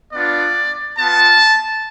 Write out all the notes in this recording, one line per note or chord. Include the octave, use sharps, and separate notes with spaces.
B3 D4 F4 D5
B3 F4 A5